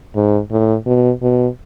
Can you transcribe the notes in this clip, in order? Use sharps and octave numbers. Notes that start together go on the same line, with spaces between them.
G#2
A2
B2
B2